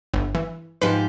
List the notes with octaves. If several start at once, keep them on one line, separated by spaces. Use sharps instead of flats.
G1
E3
G#2 F3 G4 B4